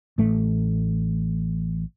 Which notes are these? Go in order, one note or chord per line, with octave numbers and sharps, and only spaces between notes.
A1 A3